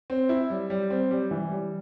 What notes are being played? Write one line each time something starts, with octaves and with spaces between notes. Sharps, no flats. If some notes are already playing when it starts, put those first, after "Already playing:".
C4
E4
G3
G3
C4
G3
E3
G3